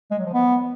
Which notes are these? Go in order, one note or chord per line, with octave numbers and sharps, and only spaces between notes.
G#3
F#3
F3
B3